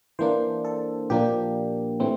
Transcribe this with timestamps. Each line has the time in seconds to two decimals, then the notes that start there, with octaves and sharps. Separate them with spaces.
0.19 E3 A#3 D4 C5
0.65 A4
1.10 A#2 F3 A#3 D4 G4
2.00 A2 E3 A3 C4